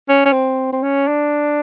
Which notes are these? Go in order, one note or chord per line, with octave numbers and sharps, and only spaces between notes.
C#4
C#4
C4
C4
C#4
D4